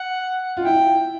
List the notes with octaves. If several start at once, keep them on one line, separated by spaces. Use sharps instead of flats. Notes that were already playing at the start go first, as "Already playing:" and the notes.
Already playing: F#5
F4
E4 G5